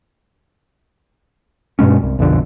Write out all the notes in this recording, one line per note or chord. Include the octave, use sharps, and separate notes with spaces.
G2 B2 G#3 C#4
C2
B1 F2 D3